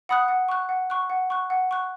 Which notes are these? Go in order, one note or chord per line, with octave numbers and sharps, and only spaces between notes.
F#5 B5 D#6 F#6
F#5
C#6 F#6
F#5
C#6 F#6
F#5
C#6 F#6
F#5
C#6 F#6